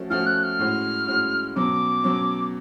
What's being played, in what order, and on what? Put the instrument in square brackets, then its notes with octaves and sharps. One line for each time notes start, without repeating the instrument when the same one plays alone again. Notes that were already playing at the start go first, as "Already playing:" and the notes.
Already playing: [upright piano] F3 A3 C#4 F#4
[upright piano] F3 A3 C#4 F#4 [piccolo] F6
[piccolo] F#6
F6
[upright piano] A2 G#3 C#4 F#4
A2 G#3 C#4 F#4
[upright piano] B2 F#3 C#4 [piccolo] D6
[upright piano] B2 F#3 C#4